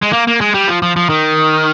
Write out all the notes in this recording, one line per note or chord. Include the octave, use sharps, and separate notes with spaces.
G#3
A#3
A#3
G#3
G3
F3
F3
F3
D#3